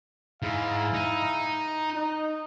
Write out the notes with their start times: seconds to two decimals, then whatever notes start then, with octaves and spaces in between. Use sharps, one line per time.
0.42 G#2 E4 G#4 F5
0.94 D#4
1.96 D#4